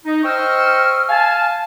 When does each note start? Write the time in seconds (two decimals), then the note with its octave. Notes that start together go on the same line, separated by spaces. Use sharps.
0.05 D#4
0.23 C5 D#5 G5 C#6 E6 F6
1.09 F5 G#5 A5